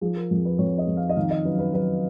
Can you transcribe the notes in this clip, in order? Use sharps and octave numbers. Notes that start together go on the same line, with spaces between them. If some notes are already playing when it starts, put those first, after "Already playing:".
F3 G#4
A#4
F2
B4
F2 C#5
D#5
F2
F5
D#5
D#3 F5
D#5
F#2 B4
B4
F#2 B4